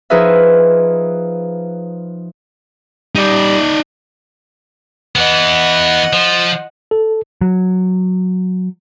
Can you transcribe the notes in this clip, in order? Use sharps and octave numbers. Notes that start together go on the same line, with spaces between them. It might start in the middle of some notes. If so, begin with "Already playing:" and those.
F3 D#4 G#4 B4 E5
G3 D#4 D5
E3 B3 D#5 F#5
F3
A4
F#3